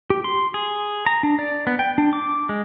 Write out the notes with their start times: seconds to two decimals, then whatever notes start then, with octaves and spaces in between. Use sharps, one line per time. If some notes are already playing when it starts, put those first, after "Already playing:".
0.10 G4
0.24 C6
0.54 G#4
1.06 A#5
1.23 D4
1.39 D5
1.67 B3
1.79 G5
1.98 D4
2.13 D6
2.49 G#3